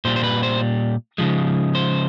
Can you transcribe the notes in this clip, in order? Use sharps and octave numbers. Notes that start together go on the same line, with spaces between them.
A#2 G3 C5
C5
B4
C5
C#3 F3 G#3
C5